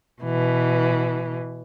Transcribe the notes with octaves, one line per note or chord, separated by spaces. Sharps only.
B2 E3